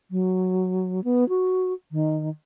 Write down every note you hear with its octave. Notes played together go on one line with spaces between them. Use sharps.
F#3
B3
F#4
D#3